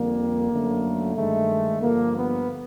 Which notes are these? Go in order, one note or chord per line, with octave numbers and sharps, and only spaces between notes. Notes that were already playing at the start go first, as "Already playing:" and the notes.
Already playing: F2 D3 G3 A#3
F#2 D3 F#3 A3
G2 D#3 G#3 A3
G2 D3 F3 A#3
B3